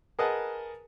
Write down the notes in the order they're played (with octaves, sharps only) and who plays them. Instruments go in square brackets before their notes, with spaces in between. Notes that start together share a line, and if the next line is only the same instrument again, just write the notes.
[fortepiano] G#4 A#4 B4 D#5 F#5 A5